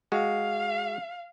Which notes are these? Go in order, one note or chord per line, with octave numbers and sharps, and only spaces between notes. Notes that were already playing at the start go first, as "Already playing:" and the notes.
G#3 F#4 F5